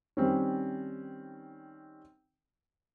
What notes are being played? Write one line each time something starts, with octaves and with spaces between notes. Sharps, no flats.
D#3 G3 C4 C#4